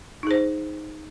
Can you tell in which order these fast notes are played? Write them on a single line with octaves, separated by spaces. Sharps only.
D#4 G#4 C5